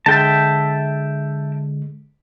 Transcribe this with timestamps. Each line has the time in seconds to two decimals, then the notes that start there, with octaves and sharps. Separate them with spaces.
0.06 D3 G#3 E5 G5 A5